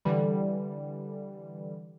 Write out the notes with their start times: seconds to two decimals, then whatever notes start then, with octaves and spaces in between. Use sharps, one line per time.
0.05 D3 E3 G3